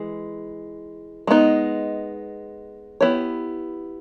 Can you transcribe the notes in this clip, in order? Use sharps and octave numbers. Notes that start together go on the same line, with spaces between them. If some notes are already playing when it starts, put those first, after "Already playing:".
Already playing: E3 G#3
G#3 B3 D#4
B3 E4 G4 C#5